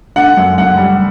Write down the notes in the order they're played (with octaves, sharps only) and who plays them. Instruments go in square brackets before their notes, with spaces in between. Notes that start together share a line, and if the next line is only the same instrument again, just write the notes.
[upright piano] D3 F#5
F#2
F#2 F#5
G3